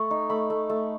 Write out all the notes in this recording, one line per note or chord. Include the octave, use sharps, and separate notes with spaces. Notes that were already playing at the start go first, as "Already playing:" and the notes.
Already playing: A3 B5 C#6
D#4
A3 B5
A3
A3